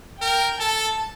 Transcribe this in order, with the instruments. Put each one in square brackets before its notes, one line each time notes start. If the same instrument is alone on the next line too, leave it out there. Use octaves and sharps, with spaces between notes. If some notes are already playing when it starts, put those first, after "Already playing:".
[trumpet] A#4 [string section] G5
[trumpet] A4 [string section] A5